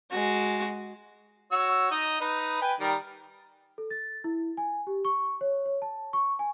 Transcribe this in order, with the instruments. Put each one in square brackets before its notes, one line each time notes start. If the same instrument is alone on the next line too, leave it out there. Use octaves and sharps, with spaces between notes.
[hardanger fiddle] G#3 F#4
[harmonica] F#4 C#5 E6
D#4 D#5
D#4 B4
B4 G5 G#5
D#3 G3 A#4
[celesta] A4
A6
E4
G#5
G4
C#6
C#5
C#5
A5
C#6
G#5